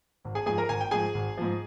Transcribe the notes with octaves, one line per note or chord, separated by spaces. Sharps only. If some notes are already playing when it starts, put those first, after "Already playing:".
G#1
G#4 G#5
G#2 F3 G#4 G#5
A#4 A#5
G#1 G#5
G5
G#2 F3 G#4 G#5
G#1
G#2 F3